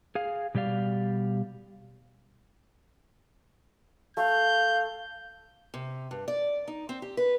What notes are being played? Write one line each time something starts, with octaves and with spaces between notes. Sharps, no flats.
G#4 F5
B2 G3 G4 D5 F5
A3 F5 G6
C3
G2
D5
D#4
C4
G4
B4